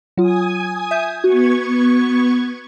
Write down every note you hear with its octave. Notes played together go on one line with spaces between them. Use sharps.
F#3 F4 G#5 D#6
E5 G6
B3 F#4 C#6 G#6